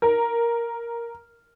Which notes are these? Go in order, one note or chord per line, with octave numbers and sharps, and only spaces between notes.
A#4